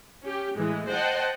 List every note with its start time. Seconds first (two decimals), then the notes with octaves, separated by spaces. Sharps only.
0.22 C#4 G4
0.56 A2 E3 G#3
0.87 C5 D#5 F#5 G5 A5